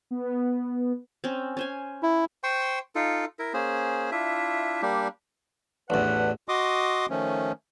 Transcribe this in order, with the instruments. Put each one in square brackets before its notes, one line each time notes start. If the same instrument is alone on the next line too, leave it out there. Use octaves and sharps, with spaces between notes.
[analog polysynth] B3
[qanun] C4 C#4
C#4 C5 G#5
[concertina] E4
[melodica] C5 G5 C6 C#6
D#4 F4 A4
E4 A#4
A#3 C#4 G#4 C5
D4 E4 F4 E5
G3 A#3 D4 G4
[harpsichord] A1 E2 [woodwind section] D4 B4 F#5
[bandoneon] F#4 D#5 C6 D6 D#6
D#3 F3 A3 C#4